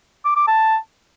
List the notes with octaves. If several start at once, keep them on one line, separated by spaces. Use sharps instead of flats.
D6
D6
A5